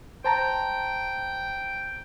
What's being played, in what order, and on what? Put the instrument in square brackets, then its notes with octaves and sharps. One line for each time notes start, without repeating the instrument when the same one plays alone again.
[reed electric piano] C5 A5 A#5 [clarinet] G5